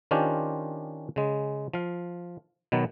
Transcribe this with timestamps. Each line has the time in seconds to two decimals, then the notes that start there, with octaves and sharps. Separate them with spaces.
0.11 D#3 C#4 D4 F4 G4 C5
1.16 C#3 G#3
1.73 F3 F5
2.72 B2 D#3 F#3 B3